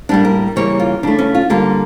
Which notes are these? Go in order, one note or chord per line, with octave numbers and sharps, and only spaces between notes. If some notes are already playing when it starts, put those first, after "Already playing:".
A2 G3 A#3 D4
A#4
C#3 E3 G3 A#3 C#5
F4
C#3 E3 A3 D4
C#4
F4
D3 G3 A#3 F4